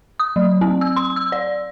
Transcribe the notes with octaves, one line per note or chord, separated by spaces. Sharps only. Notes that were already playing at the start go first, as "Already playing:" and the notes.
D#6
F#3
C4
E6
C6
E6
D5